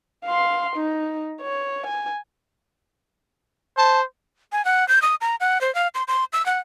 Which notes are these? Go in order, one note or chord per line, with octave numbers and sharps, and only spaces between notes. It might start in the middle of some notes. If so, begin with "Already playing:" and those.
F5 C6
D#4
C#5
G#5
C5 A5
G#5
F#5
G6
D#6
A#5
F#5
C5
F5
C6
C6
E6
F#5